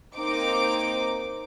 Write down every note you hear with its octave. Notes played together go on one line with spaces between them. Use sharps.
A#3 C4 D#4 D6